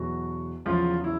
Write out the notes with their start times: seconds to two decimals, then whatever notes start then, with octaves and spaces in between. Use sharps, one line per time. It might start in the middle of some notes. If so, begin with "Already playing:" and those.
Already playing: E2 B2 F#3 F#4
0.66 E2 C#3 F3 F#3 F4
1.04 E4